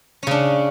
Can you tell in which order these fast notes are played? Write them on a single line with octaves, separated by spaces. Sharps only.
C#4 C#3 D4